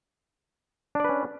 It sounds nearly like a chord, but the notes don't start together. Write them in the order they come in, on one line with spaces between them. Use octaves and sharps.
D4 D5 B4 C#4